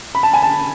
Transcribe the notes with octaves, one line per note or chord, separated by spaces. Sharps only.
B5
A5
G#5
A5